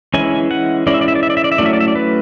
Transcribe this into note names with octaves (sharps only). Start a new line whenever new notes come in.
E3 G#3 C#4 E4 G#5
F#5
E3 G#3 C#4 E4 D5
E5
D5
E5
D5
E5
D5
E5
D5
E5
F#3 A3 C#4 E4 D5
E5
D5
E5
D5
B4